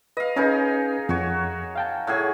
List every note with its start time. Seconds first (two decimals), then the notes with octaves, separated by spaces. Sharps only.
0.17 B4 D#5 F5
0.36 C#4 D#4 G#4 A#4 B4
1.09 F2 F#4 C#5
1.75 F5 G5 A5
2.07 A2 F#3 G#4